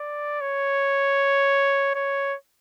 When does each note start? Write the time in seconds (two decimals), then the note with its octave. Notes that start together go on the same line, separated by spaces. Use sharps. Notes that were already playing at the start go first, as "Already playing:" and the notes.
Already playing: D5
0.41 C#5
1.95 C#5